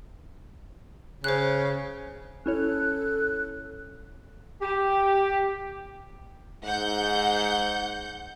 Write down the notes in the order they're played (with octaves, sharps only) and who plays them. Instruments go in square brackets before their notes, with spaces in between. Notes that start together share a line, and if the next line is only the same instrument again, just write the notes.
[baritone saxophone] C#3 [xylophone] C5 F#6
[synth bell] C#4 E4 C#5 [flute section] A4 F#6
[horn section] G4
[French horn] G#2 [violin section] F#5 G6